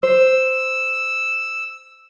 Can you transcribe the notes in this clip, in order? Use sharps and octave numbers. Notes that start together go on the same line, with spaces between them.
C5 E6